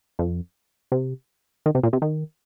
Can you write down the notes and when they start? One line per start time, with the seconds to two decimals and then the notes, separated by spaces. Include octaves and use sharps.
0.19 F2
0.92 C3
1.66 D#3
1.75 C3
1.83 A#2
1.93 C3
2.02 D#3